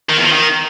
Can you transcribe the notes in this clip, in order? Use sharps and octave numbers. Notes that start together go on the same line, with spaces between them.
D#3
E2
F3
D#3